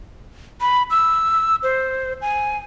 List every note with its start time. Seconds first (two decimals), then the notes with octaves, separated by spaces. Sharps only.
0.61 B5
0.90 E6
1.63 C5
2.21 G#5